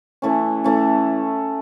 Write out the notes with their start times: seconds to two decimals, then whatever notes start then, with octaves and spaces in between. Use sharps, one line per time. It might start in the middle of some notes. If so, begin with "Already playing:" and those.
0.22 E3 A3 C#4
0.64 E3 A3 C#4